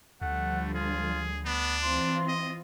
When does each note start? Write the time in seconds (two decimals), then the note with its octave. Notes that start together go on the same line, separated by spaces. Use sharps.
0.21 D2 D3 F3 G3 A3 F#5
0.75 F4 G#4
1.46 B3 D4
1.83 E3 C4 F4 C6
2.28 D#5